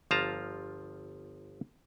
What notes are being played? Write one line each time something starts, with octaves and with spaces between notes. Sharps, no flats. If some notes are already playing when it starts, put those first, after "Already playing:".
G1 F3 F4 A5 A#5